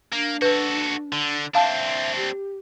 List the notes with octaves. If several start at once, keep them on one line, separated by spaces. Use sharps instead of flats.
A#3 D4
F#4 A4 B4
D3
C4 D4 E5 F5 A5
G4